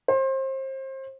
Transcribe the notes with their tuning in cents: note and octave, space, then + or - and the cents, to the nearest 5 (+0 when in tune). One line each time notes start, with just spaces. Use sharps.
C5 +30